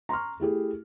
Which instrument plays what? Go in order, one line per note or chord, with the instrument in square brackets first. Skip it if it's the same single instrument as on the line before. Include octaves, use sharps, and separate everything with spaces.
[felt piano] A#5 C6 C#6 F6
A3 E4 G4 G#4